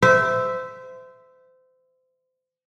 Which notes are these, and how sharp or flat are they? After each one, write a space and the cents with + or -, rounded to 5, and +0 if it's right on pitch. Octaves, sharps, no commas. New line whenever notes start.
C5 -30 E5 +0